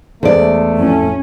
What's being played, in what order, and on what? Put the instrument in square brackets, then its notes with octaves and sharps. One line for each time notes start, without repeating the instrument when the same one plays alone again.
[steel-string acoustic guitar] E2 D5 [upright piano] C#3 G#3 C5 [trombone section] A3
[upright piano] F2 A2 F#4 [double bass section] C#4